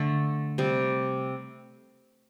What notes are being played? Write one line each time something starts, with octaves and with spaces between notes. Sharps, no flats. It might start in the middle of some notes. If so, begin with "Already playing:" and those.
Already playing: D3 A3
C3 G3